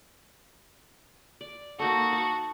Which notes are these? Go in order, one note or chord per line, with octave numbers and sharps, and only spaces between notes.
D5
A#3 D#4 F#4 A4
A5